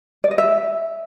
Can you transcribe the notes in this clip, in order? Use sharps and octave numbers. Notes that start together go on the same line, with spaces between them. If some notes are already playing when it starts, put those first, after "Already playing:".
D5
D#5
E5